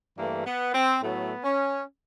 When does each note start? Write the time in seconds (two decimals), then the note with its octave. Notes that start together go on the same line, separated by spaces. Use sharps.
0.17 G2 E3 A3 A#3
0.45 B3
0.73 C4
1.02 A2 F#3 A3 B3
1.44 C#4